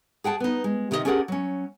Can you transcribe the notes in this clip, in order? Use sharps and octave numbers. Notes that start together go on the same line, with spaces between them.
G#4 F#5 G5 A5
B3 D#4
G#3
C3 D#3 D#4 G4 D#5 E5
C#4 D4 G4 G#4 A#4 F#5
F#3 C#4